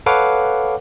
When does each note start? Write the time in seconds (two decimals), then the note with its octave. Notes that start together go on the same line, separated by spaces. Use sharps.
0.06 A4 B4 C#5 F5 F#5 D6